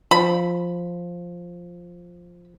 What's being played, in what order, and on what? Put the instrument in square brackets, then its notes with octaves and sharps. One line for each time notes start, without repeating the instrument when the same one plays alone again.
[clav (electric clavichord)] F3 [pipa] B5